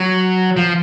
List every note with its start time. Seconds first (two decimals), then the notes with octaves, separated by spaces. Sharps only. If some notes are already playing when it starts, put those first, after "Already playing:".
Already playing: F#3
0.57 F3